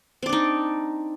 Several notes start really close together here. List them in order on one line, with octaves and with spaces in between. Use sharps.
C4 D5 D4 D#4